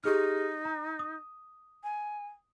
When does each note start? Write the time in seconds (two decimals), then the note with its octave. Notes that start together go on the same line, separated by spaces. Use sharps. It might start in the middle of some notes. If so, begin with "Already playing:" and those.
0.04 D#4 G4 G#4 F6
0.65 A#5
0.99 D#6
1.83 G#5